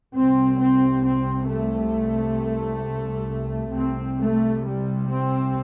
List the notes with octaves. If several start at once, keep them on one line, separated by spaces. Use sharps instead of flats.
C2 C3 C4
C4
C4
A3
C2 C3 C4
A3
G3
C4